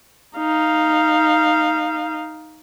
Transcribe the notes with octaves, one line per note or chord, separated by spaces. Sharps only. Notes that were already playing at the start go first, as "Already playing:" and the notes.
D#4 F5